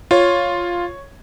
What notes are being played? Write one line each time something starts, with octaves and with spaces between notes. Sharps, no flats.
F4 C#5